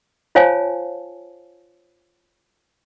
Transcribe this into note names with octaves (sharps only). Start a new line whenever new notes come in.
F4 C5 C#5 F5 G#5 A5